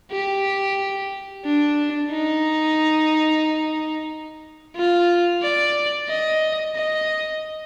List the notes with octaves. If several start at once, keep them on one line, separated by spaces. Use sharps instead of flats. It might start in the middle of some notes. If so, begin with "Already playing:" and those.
G4
D4
D#4
F4
D5
D#5
D#5